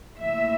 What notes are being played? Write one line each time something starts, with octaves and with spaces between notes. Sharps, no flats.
A2 F3 A#3 E5